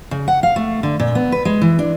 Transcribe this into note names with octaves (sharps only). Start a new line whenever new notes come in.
C#3
F#5
F5
A3
D3
A#2
B3
B4
G#3
E3
D4